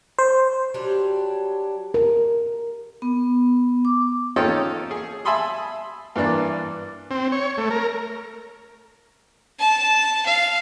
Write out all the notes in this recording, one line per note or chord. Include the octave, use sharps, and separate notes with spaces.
C5
F#3 G3 D4 G4
A#4
B3
D6
C#4 D#4 F4 A4 D#5 G5
G#4
E5 G#5 A5 B5 C6 D#6
G2 E3 A#3 D4
C4
C#5
A3
A#4
A5
F5